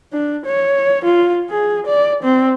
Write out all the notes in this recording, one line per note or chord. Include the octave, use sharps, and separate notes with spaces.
D4
C#5
F4
G#4
D5
C4